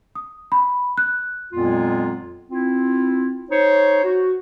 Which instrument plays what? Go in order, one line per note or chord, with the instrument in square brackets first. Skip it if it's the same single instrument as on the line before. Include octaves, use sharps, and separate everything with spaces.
[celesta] D#6
B5
F#6
[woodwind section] F2 A#2 F#3 G#3 B3 F4
C4 E4 F4
D#4 C5 C#5
F#4